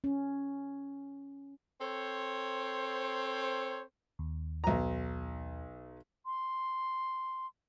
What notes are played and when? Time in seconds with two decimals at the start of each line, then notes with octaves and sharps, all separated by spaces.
0.04 C#4
1.81 C4 A4 C5 C#5
4.19 D#2
4.64 B1 A#5
6.26 C6